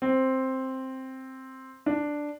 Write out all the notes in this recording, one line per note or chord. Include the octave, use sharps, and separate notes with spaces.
C4
D4